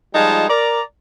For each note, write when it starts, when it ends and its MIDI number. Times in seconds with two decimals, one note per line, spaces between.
0.14 0.47 53
0.14 0.47 55
0.14 0.47 56
0.14 0.47 63
0.14 0.47 65
0.14 0.47 81
0.49 0.81 70
0.49 0.81 74
0.49 0.81 82